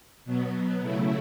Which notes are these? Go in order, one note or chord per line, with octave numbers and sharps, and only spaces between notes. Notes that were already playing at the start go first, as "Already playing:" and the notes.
B2 F#3 B3
C#3 F#3 A3 E4